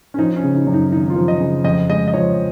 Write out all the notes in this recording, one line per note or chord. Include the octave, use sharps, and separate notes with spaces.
C#4
F3 D#4
C#4
C#3
D#4
F#2
D#4
G#1 D#4
F4
F3
D#5
C#3
F2 D#5
G#3 D#5
D#5
F3 C#5